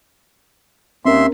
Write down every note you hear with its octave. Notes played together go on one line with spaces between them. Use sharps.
D#2 C4 C#4 A#4 E5 C6